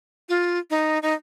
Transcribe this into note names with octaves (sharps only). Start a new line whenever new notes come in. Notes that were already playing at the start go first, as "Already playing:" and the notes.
F4
D#4
D#4